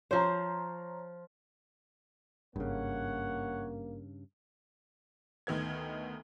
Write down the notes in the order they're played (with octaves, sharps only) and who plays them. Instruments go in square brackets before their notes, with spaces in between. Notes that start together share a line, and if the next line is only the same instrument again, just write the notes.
[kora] F3 C5 [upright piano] C#5 A#5
[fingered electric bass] G#1 [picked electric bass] G2 C#3 [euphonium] A#3 [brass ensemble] C#5 F#5
[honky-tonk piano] D2 D#3 B3 G#6